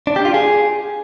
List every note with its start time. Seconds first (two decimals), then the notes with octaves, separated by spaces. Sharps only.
0.07 D4
0.16 G4
0.25 F4
0.34 G#4